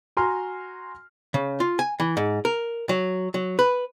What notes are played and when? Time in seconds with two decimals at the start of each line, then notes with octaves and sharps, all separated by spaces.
0.17 F#4 G#5 A#5 C6 F6
1.34 C#3
1.60 F4
1.79 G#5
2.00 E3
2.17 G#2
2.45 A#4
2.89 F#3
3.34 F#3
3.59 B4